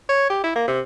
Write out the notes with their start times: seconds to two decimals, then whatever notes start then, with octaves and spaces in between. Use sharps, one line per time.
0.09 C#5
0.30 G4
0.44 E4
0.55 A#3
0.67 C3